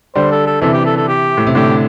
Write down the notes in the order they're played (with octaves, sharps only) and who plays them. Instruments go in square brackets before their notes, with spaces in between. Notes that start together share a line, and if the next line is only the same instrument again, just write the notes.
[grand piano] D3 G3 [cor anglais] C5
[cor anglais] A4
A4
[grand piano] C3 E3 [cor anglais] A4
[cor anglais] G4
A4
A4
G4
[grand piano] A2
C3
[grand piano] A2 D3 [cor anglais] G4